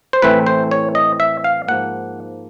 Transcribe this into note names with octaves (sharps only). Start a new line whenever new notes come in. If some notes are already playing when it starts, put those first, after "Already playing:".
C5
A2 E3 A3 C4 B4
C5
C#5
D#5
E5
F5
G#2 F3 A#3 F#5